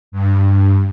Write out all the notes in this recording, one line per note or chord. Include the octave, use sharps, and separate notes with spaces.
G2